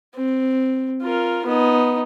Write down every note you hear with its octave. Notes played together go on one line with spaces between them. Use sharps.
C4
F4 A#4
B3 D#4